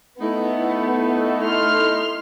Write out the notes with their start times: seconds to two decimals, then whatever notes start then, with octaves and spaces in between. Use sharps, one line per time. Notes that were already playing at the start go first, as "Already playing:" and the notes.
0.21 A3 B3 D#4 E4
1.45 C6 F6